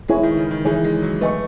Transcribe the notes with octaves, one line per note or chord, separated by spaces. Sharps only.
G#3 E4 G#4 C#5 G#5
D#3
C#3
D#3
E3 E4 G#4 C#5 G#5
G#3
F#3
A3 B4 D#5 G#5 C#6